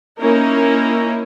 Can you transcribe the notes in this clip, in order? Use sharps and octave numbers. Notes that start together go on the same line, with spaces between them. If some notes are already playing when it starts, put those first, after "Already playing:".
A#3 C#4 D#4 E4 A#4